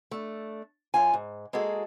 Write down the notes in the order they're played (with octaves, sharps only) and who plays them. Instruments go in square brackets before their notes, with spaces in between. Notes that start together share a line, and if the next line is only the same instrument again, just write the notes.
[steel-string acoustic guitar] A3 D4
F#2 F4 G#5
G#2
G#3 A#3 F#4 G#4 A4